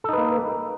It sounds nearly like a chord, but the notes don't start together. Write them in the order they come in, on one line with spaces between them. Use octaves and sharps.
A4 D#4 B4 A#3